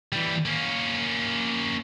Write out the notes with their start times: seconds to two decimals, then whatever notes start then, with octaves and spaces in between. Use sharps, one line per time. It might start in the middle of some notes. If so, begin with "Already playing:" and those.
0.12 E3 G3
0.45 A#3 C#4